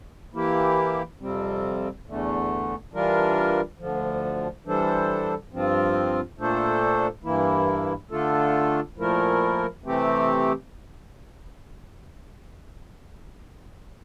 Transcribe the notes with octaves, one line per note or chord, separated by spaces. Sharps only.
E3 A#3 E4 G4
F2 C3 G3 C4
E2 D3 A3
E3 G3 D4 F4 A#4
D2 D3 F3
E3 G3 D4 A4 C5
G2 F3 C4 F4
A#2 A3 D4 A4 C5
G2 E3 A#3 E4
D3 A3 D4 F4 A4
A#2 F3 A3 E4 A#4
C3 E3 A3 C4 G4